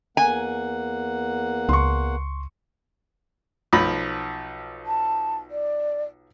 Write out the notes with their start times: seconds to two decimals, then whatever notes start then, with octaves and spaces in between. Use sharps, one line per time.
0.17 E2 A#3 F#5 G#5
1.69 C#2 C6 C#6
3.73 B1 F3 B5
4.86 A5
5.51 D5